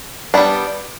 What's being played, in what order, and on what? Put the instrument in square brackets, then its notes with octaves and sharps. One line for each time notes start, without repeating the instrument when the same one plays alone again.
[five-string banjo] G3 B3 D4